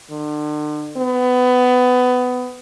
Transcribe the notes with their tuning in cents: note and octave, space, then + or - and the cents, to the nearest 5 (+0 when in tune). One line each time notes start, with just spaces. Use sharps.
D3 +40
B3 +20